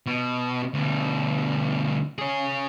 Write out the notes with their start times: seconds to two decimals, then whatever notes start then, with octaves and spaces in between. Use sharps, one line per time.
0.06 B2
0.74 D2 B2
2.19 G#4 C#5